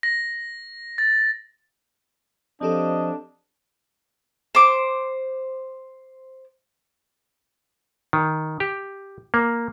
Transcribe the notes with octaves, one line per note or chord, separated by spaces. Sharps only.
A#6
A6
F3 C4 D4 G4 A4 D#5
C5 D6
D#3
G4
A#3